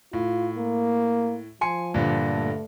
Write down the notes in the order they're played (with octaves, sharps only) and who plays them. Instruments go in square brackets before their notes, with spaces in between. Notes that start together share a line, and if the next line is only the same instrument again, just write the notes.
[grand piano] A2 [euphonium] F4
[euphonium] A#3
[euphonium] F3 [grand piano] G#5 C6 C#7
[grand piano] G2 A#2 D3
[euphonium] A3